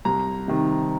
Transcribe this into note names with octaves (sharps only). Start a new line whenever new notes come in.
C2 A#5
C3 D#3